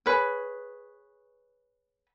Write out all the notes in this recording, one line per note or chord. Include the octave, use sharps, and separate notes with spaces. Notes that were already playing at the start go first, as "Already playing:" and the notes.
G#4 B4 C#5